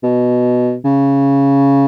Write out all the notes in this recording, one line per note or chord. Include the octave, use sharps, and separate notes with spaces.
B2
C#3